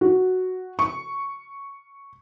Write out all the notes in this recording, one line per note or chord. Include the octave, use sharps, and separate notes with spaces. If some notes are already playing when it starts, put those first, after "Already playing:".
F#4
C#6